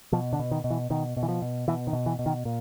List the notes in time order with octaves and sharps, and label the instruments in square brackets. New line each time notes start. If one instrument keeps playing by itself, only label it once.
[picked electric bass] B2 F3
D3
B2
D#3
B2
E3
B2 D#3
B2
E3
F3
B2
B2 E3
D#3
B2
E3
B2
D#3
A#2